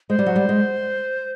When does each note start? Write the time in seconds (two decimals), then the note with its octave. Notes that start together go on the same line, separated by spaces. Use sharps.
0.10 G#3 C5
0.19 G3
0.26 F#3
0.36 G3
0.49 G#3